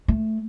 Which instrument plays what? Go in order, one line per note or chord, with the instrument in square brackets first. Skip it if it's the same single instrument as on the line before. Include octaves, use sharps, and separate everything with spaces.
[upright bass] A3